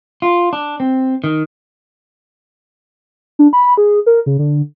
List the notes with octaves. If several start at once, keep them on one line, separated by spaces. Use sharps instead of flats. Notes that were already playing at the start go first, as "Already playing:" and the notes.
F4
D4
C4
D#3
D4
B5
G#4
A#4
C#3
D3